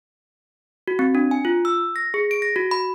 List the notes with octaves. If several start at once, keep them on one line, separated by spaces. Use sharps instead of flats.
F#4
C4
D4
G#5
F4
E6
A#6
G#4
D7
A#6
F#4
B5